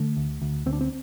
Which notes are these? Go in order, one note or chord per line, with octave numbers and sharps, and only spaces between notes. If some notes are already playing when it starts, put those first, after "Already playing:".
Already playing: D3 A3
D2
D2
D2 C4
D4
C4